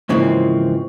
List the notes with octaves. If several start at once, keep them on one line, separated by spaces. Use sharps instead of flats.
G#2 C#3 E3 F3 A#3 C4